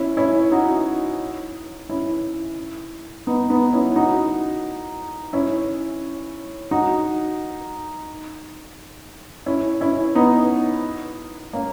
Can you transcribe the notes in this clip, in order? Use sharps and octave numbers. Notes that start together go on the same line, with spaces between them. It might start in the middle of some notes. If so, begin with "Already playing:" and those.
Already playing: C#4 E4
C#4 E4
D#4 F#4
C#4 E4
B3 D#4
B3 D#4
C#4 E4
D#4 F#4
C#4 E4
D#4 F#4
C#4 E4
C#4 E4
B3 D#4
A#3 C#4